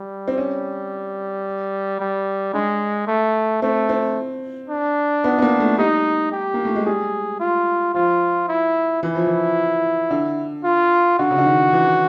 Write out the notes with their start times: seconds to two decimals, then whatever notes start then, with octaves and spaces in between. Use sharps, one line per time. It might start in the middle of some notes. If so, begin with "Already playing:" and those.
Already playing: G3
0.28 C4
0.38 C#4
2.00 G3
2.54 G#3 D4
3.07 A3
3.62 A3 C4
3.89 C4
4.70 D4
5.24 B3
5.38 B3
5.42 A#3
5.60 A3
5.78 G3 D#4
6.32 G4
6.54 A#3
6.65 A3
6.76 G#3
6.86 G3 G#4
7.40 F4
7.94 F3 F4
8.48 E4
9.03 E3 E4
9.15 F3
9.27 E3
10.11 D3
10.64 F4
11.19 D3 F#4
11.31 C#3
11.38 D3
11.46 D#3
11.73 E3